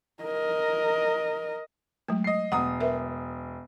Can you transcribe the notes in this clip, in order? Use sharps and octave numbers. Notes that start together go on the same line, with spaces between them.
A#4 D#5
F#3 G#3 A3
D#5 C7
E1 F#5 A#5 D#6
A#4 B4 E5